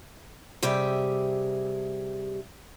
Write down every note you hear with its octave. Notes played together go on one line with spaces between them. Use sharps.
C3 G3 G4 G#4 E5